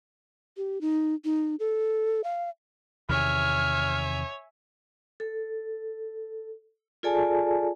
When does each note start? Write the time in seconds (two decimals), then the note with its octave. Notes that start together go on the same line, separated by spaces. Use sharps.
0.57 G4
0.81 D#4
1.25 D#4
1.60 A4
2.24 F5
3.10 E2 C3 D#3 C#5 E5 G#5 F6
5.20 A4
7.03 F4 G#4 A4 D5 G#5 A5